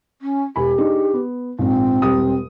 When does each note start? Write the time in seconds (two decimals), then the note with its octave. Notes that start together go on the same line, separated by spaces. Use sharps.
0.21 C#4
0.56 E1 G4 G#5 B5
0.78 D4 D#4 G#4
1.13 B3
1.59 A#1 G#2 C4
2.02 E1 G3 D#6